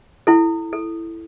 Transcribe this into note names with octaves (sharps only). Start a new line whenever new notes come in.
E4 A4
A4